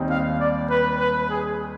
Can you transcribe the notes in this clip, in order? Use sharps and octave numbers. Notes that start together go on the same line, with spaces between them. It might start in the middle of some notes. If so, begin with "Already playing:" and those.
Already playing: D#2 D#3 G3 C4 D#4
F5
D5
B4
B4
G#4